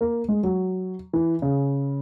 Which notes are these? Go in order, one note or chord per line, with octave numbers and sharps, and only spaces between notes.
A#3
G#3
F#3
E3
C#3